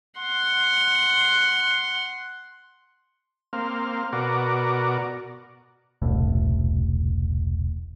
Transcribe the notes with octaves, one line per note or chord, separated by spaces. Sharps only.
F#5 C6
A#3 C4 F5
B2 F#4 A#4 D5
E1 C2 A2